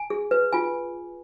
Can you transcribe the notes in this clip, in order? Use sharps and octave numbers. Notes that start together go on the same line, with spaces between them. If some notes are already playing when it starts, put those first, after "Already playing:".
Already playing: G#5
G#4
B4
F4 G#5